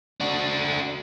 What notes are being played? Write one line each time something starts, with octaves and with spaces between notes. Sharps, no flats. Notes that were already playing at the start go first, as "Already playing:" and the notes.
D4 F#4